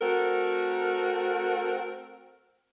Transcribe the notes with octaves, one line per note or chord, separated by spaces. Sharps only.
A3 C4 F#4 A#4